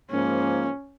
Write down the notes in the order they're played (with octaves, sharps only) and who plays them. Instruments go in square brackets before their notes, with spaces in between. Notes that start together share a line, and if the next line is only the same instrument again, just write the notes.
[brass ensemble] G#2 F3 A#3 [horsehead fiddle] C#4